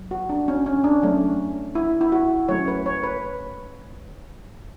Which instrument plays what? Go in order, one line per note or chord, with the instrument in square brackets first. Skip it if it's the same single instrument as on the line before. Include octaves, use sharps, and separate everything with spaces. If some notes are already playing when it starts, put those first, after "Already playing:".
Already playing: [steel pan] F#3
F#4
D4
C#4
C#4
D4
F#3 A3 C#4
E4
E4
F#4
F#3 A3 C#4 C#5
B4
C#5
B4